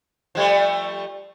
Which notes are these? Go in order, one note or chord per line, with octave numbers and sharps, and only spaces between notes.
F3 G3 A3